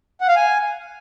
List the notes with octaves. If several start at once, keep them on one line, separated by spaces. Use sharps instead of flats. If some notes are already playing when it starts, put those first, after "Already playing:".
F#5
F5
G#5